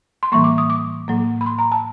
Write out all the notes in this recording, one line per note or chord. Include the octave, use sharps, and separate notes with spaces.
C6
A2 E3 G3 A#3 C#6
D6
D#6
D6
A2 F#3 A#3
B5
C6
A#5
A5